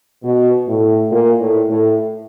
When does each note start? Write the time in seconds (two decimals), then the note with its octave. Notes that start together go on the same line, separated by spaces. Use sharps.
0.23 B2
0.67 A2
1.11 A#2
1.40 A2
1.69 A2